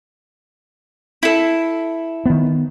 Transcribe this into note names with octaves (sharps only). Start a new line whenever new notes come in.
E4 A4
D#3 B3